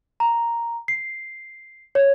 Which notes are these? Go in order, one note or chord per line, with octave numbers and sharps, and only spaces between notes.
A#5
C7
C#5